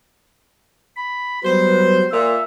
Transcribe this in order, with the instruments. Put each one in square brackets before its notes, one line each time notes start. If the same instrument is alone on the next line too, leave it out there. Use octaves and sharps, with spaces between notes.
[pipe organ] B5
[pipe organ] F#3 G3 B3 [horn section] B4 C5
[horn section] A#2 [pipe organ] E5